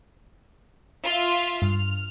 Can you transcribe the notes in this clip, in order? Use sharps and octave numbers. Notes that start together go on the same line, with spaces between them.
F4 E5
G2 F6